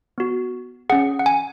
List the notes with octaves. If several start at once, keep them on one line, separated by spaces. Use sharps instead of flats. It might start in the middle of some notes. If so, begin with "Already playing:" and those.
B3 F#4
C#4 G#4 F#5
F#5
G#5